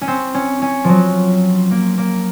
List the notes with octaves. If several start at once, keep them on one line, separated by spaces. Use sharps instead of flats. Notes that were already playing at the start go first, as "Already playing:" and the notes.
C#4
C4
C#4
C#4
F3 F#3
A#3
A#3